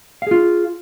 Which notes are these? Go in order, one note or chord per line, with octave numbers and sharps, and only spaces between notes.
F4 G#4 F5